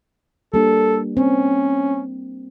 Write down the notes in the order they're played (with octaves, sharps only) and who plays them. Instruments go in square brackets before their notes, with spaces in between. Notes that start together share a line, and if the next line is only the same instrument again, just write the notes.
[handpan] G3 A#3 D4 [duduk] A4
[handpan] C4 [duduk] C#4